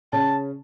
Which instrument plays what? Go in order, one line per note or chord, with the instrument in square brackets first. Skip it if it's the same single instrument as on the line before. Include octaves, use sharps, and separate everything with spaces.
[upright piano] C#3 C#4 [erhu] A5